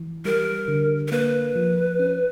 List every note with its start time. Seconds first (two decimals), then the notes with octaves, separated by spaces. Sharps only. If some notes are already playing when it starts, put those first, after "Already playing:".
Already playing: E3
0.25 G3 A#4
0.68 D3
1.08 A#4
1.11 A#3 B4
1.55 F3
1.99 C#4